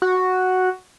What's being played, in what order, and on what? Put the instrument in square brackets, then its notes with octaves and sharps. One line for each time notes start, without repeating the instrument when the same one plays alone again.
[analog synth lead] F#4